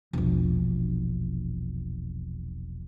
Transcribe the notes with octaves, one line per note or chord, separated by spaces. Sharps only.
E1 A#1